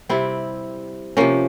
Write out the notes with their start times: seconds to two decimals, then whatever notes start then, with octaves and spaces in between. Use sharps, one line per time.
0.09 C3 G3 C4 E4
1.17 C3 F3 A#3 C#4